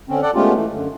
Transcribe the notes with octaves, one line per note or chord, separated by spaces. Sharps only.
D3 C4 C#4
A4 D5 F#5
G#3 A3 B3 C#4 F4 G4
E3 A3
F#2 D3